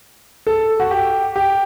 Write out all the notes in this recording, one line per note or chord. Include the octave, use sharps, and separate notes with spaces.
A4
F#4
G4
G4